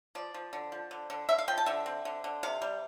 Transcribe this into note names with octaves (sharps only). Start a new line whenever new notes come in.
F3 D5
F3
D3
F3
D3
D3
D3 E5
F5
F3 G5
A5
D3 E5
C4
D3
D3
C3 F5
G3